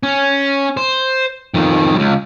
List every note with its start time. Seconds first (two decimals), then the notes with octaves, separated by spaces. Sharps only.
0.03 C#4
0.77 C5
1.54 F2 D#3
1.94 C#2 F#2